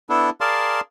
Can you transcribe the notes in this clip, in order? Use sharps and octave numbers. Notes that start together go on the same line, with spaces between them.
B3 D4 E4 A4
G#4 A#4 D5 F5 A5 C6